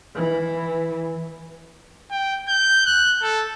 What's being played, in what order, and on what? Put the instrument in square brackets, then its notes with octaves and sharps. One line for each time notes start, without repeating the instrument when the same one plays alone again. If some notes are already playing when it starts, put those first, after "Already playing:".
[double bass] E3
[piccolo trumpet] G5
G6
F#6
A4